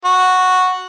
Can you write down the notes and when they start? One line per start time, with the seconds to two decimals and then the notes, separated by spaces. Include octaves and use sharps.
0.05 F#4